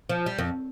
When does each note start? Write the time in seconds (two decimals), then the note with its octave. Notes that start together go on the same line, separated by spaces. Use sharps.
0.09 F3
0.26 G3
0.38 F2